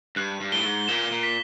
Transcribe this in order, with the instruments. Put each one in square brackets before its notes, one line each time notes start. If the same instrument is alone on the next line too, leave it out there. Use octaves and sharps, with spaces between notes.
[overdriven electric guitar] G2 [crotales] F#6
[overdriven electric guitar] G2
[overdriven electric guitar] A2 [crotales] G7
[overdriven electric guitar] G#2
[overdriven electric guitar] A#2 [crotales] E7
[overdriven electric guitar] A#2
[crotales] B6